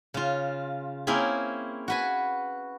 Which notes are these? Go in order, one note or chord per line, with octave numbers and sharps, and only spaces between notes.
C#3 F4
A#3 C4 C#4 E4 G#4
F#4 B4 G#5